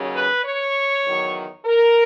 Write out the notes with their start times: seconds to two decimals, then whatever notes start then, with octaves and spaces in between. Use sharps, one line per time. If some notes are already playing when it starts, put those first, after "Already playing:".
Already playing: D#2 C#3 F#3
0.14 B4
0.44 C#5
1.05 E2 D#3 F#3
1.65 A#4